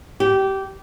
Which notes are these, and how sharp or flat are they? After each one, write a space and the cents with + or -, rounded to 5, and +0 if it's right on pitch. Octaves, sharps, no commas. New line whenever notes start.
G4 -20